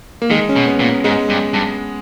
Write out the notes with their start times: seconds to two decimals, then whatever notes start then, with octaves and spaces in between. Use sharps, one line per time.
0.22 A#3
0.30 D#3 G#3
0.49 C#4
0.56 B2
0.67 B3
0.80 A#2
1.04 G#2 G#3
1.29 G2
1.53 G2